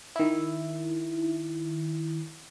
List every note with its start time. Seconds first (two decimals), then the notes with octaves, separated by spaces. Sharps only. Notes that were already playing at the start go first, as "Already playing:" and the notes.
0.16 D#3 E4